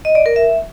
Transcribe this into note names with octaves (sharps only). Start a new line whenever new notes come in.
D#5
D5
A#4
E5